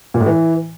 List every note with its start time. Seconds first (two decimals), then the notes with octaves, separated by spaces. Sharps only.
0.14 A#2
0.20 A2
0.26 E3